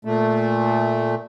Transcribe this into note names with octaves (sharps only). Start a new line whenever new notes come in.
A#2 A3